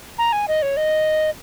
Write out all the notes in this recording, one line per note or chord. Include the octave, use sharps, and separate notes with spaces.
A#5
G#5
D#5
C#5
D#5